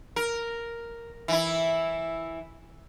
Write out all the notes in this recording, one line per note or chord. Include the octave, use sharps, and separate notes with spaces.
A#4
E3 E4